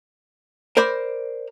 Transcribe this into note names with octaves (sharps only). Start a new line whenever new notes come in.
A#4 C5 D5 B5